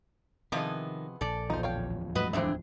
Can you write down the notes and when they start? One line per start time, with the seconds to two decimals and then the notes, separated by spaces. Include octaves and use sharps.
0.52 C3 D#3 F3 B3 E4 G#4 D#5
1.21 A#1 A4 D5
1.50 D1 E2 F3 D#4 C5
1.63 C#5 F5 G5
2.15 G#2 F#3 A3 F#4 B4 D#5
2.33 G2 D3 E3 C4 G#4 E5